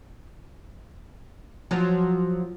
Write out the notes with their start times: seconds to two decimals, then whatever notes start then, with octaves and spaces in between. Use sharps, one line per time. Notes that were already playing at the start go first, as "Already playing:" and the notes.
1.71 F3 F#3